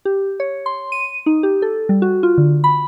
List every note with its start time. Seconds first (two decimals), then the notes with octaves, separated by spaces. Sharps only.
0.05 G4
0.40 C#5
0.66 C6
0.92 D#7
1.26 D#4
1.43 G4
1.62 A4
1.89 G3
2.02 F#4
2.23 F4
2.38 D3
2.64 B5